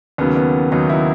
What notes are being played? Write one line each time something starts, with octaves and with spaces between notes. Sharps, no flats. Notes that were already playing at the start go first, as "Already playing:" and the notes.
D#2 C#3 F#3 B3
B3
D#2 C#3 F#3 D#4
E4